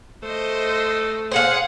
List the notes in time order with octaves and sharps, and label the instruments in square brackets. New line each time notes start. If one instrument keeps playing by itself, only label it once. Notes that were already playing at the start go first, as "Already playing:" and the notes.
[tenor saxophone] A3 [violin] C5 D#5
[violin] G#4 F#5 [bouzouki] C5 F5